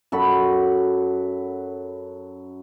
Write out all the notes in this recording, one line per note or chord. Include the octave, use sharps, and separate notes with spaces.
F#2 F#4 A4 B5